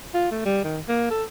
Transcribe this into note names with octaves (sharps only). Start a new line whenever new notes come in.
F4
A3
G3
D#3
A#3
A4